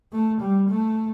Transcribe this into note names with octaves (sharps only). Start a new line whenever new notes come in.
A3
G3
A3